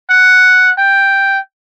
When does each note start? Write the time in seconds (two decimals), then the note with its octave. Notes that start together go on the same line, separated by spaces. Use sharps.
0.10 F#5
0.78 G5